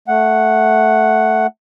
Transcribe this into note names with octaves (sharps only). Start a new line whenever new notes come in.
A3 F#5